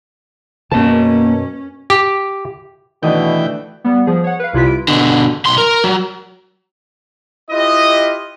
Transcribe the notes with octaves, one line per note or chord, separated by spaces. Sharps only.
F#2 B2 A#3 C#4 A5
G4
B2 D#3 E3 A3 D4 B4 D#5 G5
G3 B3
F3 G#4
C#5 F#5
B4 F5
C2 C3 E4 F4 B4 B6
D7
B2 D3
B1 C6
A#4
F#3
E4 F4 G4 B4 D#5